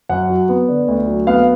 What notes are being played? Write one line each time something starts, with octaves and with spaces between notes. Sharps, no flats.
F#2 F#5
F#3
B3
D3
D2
F#3
B3 F5